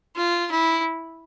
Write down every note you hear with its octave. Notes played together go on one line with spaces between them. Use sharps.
F4
E4